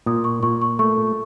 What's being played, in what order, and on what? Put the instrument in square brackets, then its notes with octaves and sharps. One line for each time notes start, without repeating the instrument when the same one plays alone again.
[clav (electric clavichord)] A#2 [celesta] D#6
[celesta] C#6
[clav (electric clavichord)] A#2 [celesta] C#6
[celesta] C#6
[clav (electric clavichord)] A3 [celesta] C#6